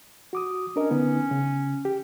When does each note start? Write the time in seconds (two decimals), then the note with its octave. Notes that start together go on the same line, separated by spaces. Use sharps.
0.33 F#4 D6 D#6
0.76 C#4 D4 A#4 D#5
0.91 D3 B3 D#4
1.31 C#3
1.85 G4